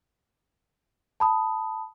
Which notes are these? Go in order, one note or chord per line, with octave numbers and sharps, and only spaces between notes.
A5 B5 D#6